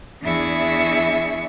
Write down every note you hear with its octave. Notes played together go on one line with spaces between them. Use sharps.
E2 D4 E4 G#4 E5 C#6